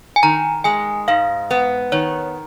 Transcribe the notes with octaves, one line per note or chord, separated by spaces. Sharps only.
G#5
D#3 A#5
G#3 G#5
G#2 F5
B3
D#3 C#5